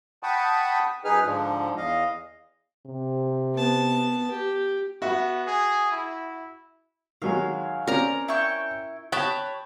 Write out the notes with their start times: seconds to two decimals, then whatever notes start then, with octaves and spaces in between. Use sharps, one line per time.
0.23 F#5 G5 A5 B5 C#6 D#6
1.04 F#2 D#4 G#4 B4 F6
1.24 G#2 D3 F3
1.77 E2 D#5 F5
2.86 C3
3.54 B3 A5
4.30 G4
5.02 B3 F#4 E5
5.47 G#4
5.92 E4
7.22 D#3 F#3 G#3 F5
7.87 C4 C#4 A#4 D5 A#5
8.28 E4 G5 C#6
9.12 C#5 G5 A5 B5 D#6 F#6